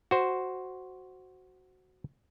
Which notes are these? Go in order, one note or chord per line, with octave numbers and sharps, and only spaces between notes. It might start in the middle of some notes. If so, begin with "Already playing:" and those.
F#4 C5